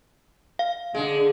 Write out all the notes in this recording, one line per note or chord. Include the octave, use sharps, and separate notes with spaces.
F5
D3 G#3